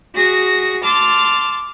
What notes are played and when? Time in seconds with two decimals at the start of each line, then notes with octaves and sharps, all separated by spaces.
0.15 F#4 G#4 A#6
0.83 A5 C6 D6 F6 A6